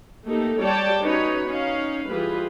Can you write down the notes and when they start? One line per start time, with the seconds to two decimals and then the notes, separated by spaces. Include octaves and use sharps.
0.26 A3 A#3 D#4 G4 A4
0.62 G3 C#5 D5 G5 A5
1.01 C#4 D#4 F#4 B4 C#5
1.47 C#4 D#4 F5
2.08 E3 G3 F4 G#4 B4